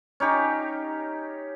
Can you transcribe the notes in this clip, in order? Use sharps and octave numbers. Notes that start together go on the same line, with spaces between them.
C#4 D#4 G4